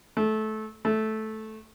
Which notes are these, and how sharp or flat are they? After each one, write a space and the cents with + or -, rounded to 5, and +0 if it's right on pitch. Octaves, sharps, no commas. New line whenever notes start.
A3 -20
A3 -10